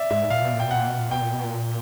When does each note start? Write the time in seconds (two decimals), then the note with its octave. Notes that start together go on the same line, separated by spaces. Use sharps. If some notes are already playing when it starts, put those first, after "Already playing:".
Already playing: D5 E5
0.10 G#2 E5
0.30 A#2 F5
0.42 B2
0.53 A#2
0.60 G5
0.65 B2
0.71 A#2 F#5
0.87 B2
0.99 A#2
1.10 B2 G5
1.21 A#2
1.33 B2
1.44 A#2